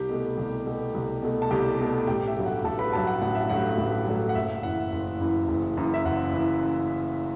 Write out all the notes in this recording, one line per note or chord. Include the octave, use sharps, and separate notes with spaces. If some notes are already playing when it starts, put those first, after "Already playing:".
Already playing: C2 G4 G5
B2 A3
C2
B2 A3
C2
B2 A3
A5
C2 G4 G5
B2 A3
A1 G4 G5
E5
G2 F#3 A3
F#5
A1 A4 A5
B4 B5
G2 F#3 A3 A4 A5
F#5
A1 F#5
E5
G2 F#3 A3 F#5
A1
G2 F#3 A3
F#5
F#1 E5
F#2 E3 F#5
F#1
F#2 E3
F#1
F#2 E3
E5
F#1 F#5
F#2 E3